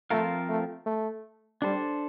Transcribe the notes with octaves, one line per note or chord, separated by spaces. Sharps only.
F3 A3 C4 F4 A#4 F5
A3
A3
G3 D4 A4 C5